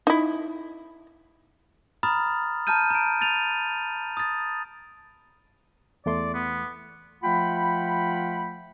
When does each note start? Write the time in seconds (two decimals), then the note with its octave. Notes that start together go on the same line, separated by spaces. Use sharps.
0.07 D#4 E4
2.03 A#5 B5 D#6 F6 A6
2.67 A5 A#5 F6 G6 D#7
2.90 A#5 D7
3.21 A6 D#7 F7
4.17 D#6 A6
6.06 E2 A3 D5 C6
6.34 B3
7.23 F3 A3 F4 F#5 G5 B5